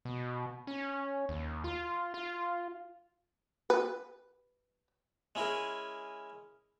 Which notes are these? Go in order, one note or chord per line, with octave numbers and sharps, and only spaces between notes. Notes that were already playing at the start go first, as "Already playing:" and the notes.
B2
C#4
D#2
F4
F4
B4
G#3 C#4 E4 G#4 A#4